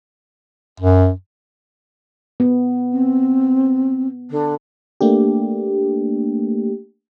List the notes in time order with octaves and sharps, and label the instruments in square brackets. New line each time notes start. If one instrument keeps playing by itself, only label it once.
[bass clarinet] F#2
[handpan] B3
[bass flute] C4
D3
[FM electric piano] A3 A#3 D4 G4